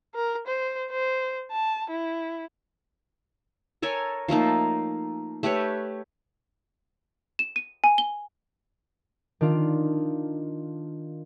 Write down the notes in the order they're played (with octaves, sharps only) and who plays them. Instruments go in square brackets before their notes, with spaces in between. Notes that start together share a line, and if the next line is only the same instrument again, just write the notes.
[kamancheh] A#4
C5
C5
A5
E4
[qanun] A4 A#4 C#5 G#5
F3 A3 A#3 D#4
A3 G4 B4 C#5
[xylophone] E7
D#7
G#5
G7
[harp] D#3 D4 F4